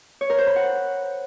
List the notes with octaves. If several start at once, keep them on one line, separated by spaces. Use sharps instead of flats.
C#5
A#4
C5
B5
F#5